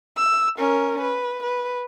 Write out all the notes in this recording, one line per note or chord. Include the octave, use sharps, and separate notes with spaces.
E6
C#4 A#4
B4
B4